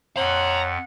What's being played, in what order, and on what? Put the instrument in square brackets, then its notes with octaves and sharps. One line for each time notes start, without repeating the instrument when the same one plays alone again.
[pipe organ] F2 [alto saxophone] C#5 [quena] F#5 [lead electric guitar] A#5 C6